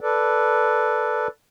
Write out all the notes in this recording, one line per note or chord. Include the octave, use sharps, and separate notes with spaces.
A4 B4 D5